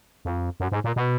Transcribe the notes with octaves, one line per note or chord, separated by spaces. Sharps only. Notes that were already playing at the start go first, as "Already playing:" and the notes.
F2
F#2
G#2
A#2
B2